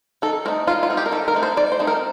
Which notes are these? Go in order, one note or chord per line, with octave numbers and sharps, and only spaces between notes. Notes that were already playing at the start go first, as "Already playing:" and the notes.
D#3 A4
A3 C4 D#4 A#4
D#3 F4
F4
A3 C4 D#4
G4
A#4
D#3 A4
A#4
A3 C4 D#4
C5
D#3 D5
C5
A3 C4 D#4
A#4